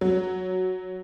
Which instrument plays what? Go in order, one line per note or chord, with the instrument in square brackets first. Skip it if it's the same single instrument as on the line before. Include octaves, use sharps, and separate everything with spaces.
[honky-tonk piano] F#3